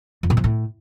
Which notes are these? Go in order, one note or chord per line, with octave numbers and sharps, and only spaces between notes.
F2
A#2
F3
A2